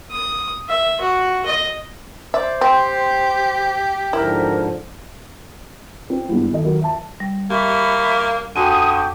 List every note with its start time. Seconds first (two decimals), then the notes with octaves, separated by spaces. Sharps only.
0.11 D#6
0.69 E5
1.01 F#4
1.46 D#5
2.34 C5 D5 E5
2.61 C4 G4
4.13 G#2 D3 F3 E4 A#4
6.10 C4
6.28 G2 G3 G#3 A#3 B3 E4
6.51 D#3 A4 D#5
6.64 D#3 F#3 A#4
6.81 E5 A5
7.20 G3
7.50 A#3 G4 E5 B5 C#6
8.56 F2 D3 F#4 G4 G#5 C#6 D#6